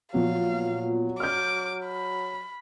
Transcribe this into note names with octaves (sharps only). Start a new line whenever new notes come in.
A#2 F3 F#3 B3 F5
D6 F6 G6
B5